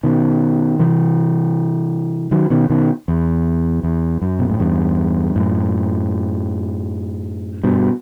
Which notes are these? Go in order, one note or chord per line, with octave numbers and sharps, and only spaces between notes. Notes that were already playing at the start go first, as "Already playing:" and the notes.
B2 D#3
C3 E3
D#3 F#3
B2 D#3
B2 D#3
E2
E2
F#2
B2
A2
E2 G2
F#2 A2
G2 B2